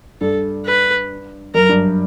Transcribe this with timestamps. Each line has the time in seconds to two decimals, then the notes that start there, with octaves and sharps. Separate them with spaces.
0.21 G2 A4
0.66 B4
1.54 F#2 A#4
1.69 G2